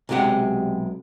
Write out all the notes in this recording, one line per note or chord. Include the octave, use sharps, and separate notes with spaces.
B1 C3 G#3 G4 F#5